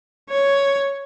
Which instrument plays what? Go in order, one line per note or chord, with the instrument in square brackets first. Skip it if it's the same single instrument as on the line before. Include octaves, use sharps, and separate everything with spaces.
[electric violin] C#5